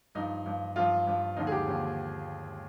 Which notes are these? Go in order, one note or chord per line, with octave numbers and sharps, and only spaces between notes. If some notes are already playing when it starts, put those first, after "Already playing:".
G2 F3 D#4
G2 F3
G2 F3 F4
G2 F3
D#2 D3 F3 D#4
G#4
G4
D#2 D3 F3